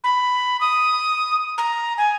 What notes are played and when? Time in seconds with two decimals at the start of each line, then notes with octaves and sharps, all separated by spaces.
0.04 B5
0.61 D#6
1.58 A#5
1.98 G#5